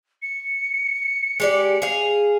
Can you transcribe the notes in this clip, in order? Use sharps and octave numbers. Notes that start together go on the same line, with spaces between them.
C#7
G#3 G4 D5
G#4 F5